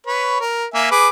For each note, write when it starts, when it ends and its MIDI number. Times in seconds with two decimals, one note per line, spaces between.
0.07 0.40 71
0.07 0.40 73
0.41 0.66 70
0.74 0.90 58
0.74 0.90 76
0.74 0.90 80
0.91 1.09 68
0.91 1.09 71
0.91 1.09 86